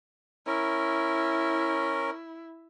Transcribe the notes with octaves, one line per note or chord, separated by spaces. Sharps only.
C#4 E4 A#4